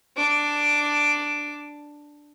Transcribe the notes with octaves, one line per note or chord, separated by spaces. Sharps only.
D4 D6